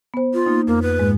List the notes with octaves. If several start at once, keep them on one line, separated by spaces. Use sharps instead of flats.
B3 C5
F4
A#3 D#4
F2 A#3
B4
G#2 G#3